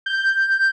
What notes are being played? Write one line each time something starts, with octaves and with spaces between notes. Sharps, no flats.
G6